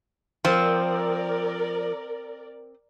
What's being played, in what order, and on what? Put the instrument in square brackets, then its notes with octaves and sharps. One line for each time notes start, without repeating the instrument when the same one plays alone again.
[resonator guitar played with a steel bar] F3 [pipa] C4 [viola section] A#4 D5